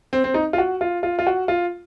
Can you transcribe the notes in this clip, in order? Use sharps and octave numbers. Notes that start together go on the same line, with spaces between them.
C4
C4
D#4
F4
F#4
F4
F4
F4
F#4
F4